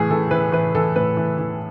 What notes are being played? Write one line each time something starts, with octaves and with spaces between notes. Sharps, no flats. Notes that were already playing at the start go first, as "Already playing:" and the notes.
Already playing: A2 E3 G#4
E3 A4
E3 B4
E3 B4
E3 A4
A2 B4
E3
E3